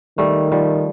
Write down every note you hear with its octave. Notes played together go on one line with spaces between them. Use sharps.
D#3 G3 A3
F3 G3